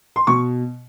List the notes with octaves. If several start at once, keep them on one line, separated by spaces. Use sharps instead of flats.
C6
B2 C#6